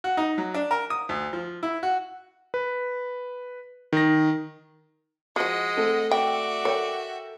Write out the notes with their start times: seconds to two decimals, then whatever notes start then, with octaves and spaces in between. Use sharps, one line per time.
0.04 F#4
0.17 D#4
0.38 F#3
0.54 D4
0.71 A#4
0.90 D#6
1.09 D2
1.33 F3
1.63 E4
1.83 F#4
2.54 B4
3.93 D#3 A#6
5.36 F3 G#3 F#4 D#5 F#5
5.77 A3 C4 A4
6.11 F#4 D5 E5 G5
6.65 A4 A#4 C#5 G5